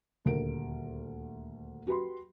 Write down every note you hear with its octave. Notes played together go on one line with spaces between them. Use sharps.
D#1 D2 A#4 D7
F#4 G4 B4 B5 C6